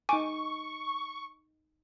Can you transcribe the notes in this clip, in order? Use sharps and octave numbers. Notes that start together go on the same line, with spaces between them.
D#4 G#5 C#6 D6